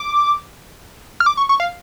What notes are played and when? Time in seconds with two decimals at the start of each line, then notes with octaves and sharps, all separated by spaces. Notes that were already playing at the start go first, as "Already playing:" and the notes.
Already playing: D6
1.20 F6
1.26 D6
1.37 C#6
1.49 C#6
1.60 F5